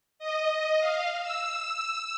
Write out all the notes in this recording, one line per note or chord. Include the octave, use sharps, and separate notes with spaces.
D#5
F5
E6